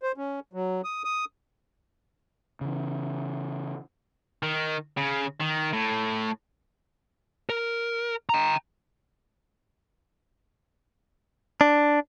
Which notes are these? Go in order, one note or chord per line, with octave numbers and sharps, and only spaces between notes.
C5
C#4
F#3
D#6
D#6
C#3 E3
D#3
C#3
D#3
A2
A#4
G5 A#5
D4